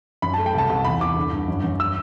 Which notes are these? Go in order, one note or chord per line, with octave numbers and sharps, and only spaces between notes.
F#2 B5
A3 A5
G5
C2 A5
C2
E2 B5
E2 D6
D3
G2
F#2
F#2
E6